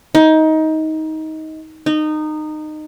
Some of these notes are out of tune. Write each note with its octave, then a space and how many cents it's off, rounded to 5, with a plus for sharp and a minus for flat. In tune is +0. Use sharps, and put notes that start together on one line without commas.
D#4 +20
D#4 -20